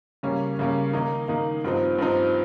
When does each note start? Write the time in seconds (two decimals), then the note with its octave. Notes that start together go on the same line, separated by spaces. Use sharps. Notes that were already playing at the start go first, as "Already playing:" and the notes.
0.23 C#3 G3 A#3 C#4
0.59 C#3 G3 A#3 C#4
0.93 D#3 A#3 D#4
1.28 D#3 A#3 D#4
1.64 G2 F3 C4 D#4
1.98 G2 F3 C4 D#4